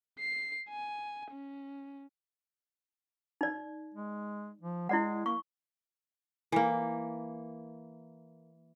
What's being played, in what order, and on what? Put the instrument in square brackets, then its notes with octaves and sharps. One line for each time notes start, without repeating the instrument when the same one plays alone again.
[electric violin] C7
G#5
C#4
[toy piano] D#4 D5
[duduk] G#3
F3
[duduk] G#3 [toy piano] E4 D5 F#5
[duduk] A#3 [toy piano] C#6
[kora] E3 A#3